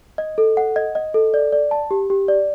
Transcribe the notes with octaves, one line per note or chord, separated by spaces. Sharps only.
D#5
A4
F#5
D#5
D#5
A4
D5
D5
A5
G4
G4
D5